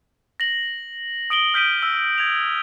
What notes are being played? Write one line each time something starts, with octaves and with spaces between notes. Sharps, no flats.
A#6 F#7
D#6 D7 F#7 G7
F6 G6 B6 D7 D#7
E6
G#6 F7